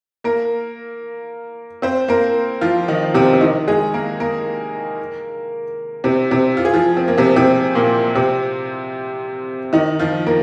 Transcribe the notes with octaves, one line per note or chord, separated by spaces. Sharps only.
A#3 A#4
C4 C5
A#3 A#4
F3 F4
D#3 D#4
C3 C4
C4
D#3 D#4
G#3 G#4
A#3 A#4
A#3 A#4
C3 C4
C3 C4
F4
G#4
F3 F4
C4
A#3
C3 C4
C3 C4
A#2 A#3
C3 C4
D#3 D#4
F3 F4
A#3 A#4